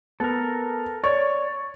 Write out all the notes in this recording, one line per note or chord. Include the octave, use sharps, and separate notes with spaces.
B3 A4 A#4
C#5 D5 C#6